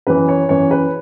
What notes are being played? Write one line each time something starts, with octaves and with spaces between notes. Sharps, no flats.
F#2 E3 B4
C#5
F#2 E3 C#5
B4